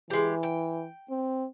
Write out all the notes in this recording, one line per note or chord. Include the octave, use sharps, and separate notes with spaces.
E3 G#3 G4
G5
C4